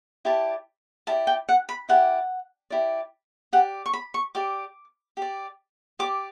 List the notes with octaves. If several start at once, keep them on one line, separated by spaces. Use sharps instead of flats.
E4 G4 D5 A5
E4 G4 D5 A5
G5
F#5
B5
E4 G4 D5 F#5
E4 G4 D5
G4 D5 F#5
C#6
B5
C#6
G4 D5 D6
G4 D5
G4 D5 D6